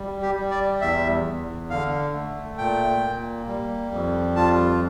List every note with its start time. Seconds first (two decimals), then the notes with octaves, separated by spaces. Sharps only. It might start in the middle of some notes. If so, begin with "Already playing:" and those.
Already playing: G3
0.22 G4
0.36 G3
0.51 D5
0.81 E2 E5
1.25 E2
1.70 D3 F5
2.14 A3
2.58 A#2 G5
3.04 A#3
3.47 G3
3.92 F2
4.36 F4 A5